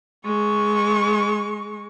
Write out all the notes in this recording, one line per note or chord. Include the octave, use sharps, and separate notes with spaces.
G#3 C#6